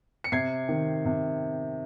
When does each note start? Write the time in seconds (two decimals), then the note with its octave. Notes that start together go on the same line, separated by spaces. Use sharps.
0.24 C#7
0.32 C3 G#6 C7
0.69 D#3
1.05 C3